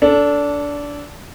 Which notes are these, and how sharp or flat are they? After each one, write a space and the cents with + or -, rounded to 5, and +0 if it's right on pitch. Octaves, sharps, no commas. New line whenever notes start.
D4 -20 A4 +0